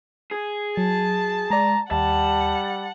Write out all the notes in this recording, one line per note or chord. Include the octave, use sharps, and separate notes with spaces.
G#4
F#3 A5
G#3 D5 A#5
D#2 G3 F#5 A5